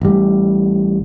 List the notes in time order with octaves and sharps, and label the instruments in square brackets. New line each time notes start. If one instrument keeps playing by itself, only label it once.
[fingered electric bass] A1 G3